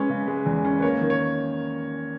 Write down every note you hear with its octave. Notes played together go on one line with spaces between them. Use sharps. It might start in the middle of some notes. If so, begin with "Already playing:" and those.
Already playing: G#3 C#4 B4
C#3
G#3
E2
C#4
B4
A#3 C#5
D#3
C#5